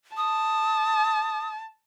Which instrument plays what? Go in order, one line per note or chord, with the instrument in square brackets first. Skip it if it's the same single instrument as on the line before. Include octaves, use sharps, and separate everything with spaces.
[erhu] A5 [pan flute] D#6